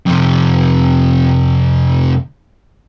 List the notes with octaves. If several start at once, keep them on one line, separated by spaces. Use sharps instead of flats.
F2 C3